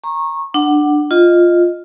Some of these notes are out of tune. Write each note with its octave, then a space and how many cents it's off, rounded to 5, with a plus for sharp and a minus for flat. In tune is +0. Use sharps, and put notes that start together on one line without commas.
A#5 +0 C#6 -20
D4 +15 F#5 +10
F4 +0 D#5 +0